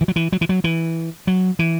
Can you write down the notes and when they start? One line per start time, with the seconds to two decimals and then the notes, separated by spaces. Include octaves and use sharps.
0.01 E3
0.08 F#3
0.16 E3
0.32 F#3
0.41 E3
0.49 F#3
0.64 E3
1.27 F#3
1.59 E3